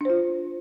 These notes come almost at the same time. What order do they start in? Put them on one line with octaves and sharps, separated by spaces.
D4 C5 F4